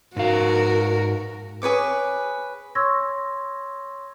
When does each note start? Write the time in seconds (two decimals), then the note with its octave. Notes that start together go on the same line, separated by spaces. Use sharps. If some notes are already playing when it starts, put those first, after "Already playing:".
0.16 G#2 F#4 A#4 F5
1.62 G#4 B4 C#5 D6
2.75 C#5 C6 C#6 E6 G#6 A#6